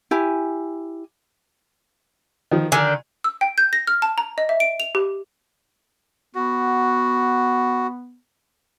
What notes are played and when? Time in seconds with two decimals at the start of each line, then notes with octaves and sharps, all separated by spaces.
0.11 E4 G4 G#5
2.51 D#3 F3
2.72 D3 D#3 G#5
3.24 E6
3.41 G5
3.58 G6
3.73 A#6
3.87 F6
4.02 A5
4.18 A#5
4.38 D#5
4.49 E5
4.60 D7
4.80 F7
4.95 G4
6.35 B3 F#4